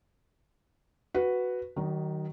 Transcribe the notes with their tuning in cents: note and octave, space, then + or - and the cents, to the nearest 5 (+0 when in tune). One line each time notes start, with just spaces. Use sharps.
F#4 +0 B4 +0
D#3 +0 F#3 +40 D#4 +0